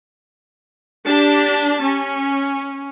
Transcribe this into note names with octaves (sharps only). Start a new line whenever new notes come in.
D4 G4 A5
C#4